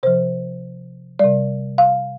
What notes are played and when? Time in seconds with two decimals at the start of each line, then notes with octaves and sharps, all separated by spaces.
0.03 C3 F3 C5
1.19 C3 G3 D5
1.78 F5